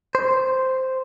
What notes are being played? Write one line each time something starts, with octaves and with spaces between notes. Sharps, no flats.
C5